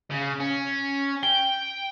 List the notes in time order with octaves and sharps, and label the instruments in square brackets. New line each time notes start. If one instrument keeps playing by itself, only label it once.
[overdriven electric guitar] C#3
C#4
[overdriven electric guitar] G5 [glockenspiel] G7